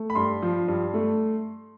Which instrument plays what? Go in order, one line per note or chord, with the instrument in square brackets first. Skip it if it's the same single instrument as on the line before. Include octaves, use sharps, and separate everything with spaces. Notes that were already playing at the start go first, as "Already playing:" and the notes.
Already playing: [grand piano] A3
B5
G2 C6
F3
G2
A3